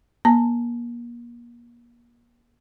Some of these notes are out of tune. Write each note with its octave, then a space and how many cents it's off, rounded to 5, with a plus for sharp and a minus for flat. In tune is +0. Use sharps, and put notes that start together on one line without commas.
A#3 +35 A5 +45